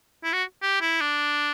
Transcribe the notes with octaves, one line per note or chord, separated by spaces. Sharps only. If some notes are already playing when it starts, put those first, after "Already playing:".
E4
F#4
G4
E4
D4